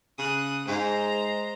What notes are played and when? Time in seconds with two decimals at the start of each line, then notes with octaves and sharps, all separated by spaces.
0.19 C#3 D#6 F#6
0.68 G#2 G#3 C5 A#5